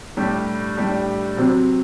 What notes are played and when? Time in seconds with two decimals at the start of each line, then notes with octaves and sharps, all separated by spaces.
0.17 A2 G3 D4 G4
0.77 A2 G3 D4 G4
1.37 C3 F#3 C4